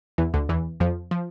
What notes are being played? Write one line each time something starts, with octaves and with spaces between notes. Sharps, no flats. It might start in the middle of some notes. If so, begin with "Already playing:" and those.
E2 E3
D2 D3
E2 E3
F2 F3
F3